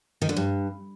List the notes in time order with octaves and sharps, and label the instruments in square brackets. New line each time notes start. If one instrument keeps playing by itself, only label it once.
[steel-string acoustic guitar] D#3
D3
G2